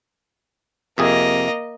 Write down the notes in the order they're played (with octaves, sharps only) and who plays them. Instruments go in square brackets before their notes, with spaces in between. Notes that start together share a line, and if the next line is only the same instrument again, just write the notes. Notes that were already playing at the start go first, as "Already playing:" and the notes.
[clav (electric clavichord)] F2 C3 G#4 [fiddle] A#3 D#5